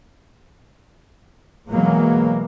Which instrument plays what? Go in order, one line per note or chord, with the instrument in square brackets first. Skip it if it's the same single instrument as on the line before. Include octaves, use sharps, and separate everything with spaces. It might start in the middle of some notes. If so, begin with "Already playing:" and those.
[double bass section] B2 E3 F#3 G#3 A#3